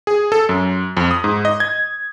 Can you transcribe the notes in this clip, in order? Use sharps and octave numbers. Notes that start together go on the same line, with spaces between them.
G#4
A4
F#2
F2
D#6
G#2
D#5
G#6